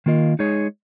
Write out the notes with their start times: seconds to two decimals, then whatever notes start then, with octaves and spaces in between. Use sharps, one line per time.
0.06 D#3 A#3 F4 A#4 D#5
0.39 G#3 D#4 G#4 C#5